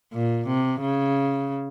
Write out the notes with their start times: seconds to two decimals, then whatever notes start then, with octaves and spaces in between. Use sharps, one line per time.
0.13 A#2
0.47 C3
0.81 C#3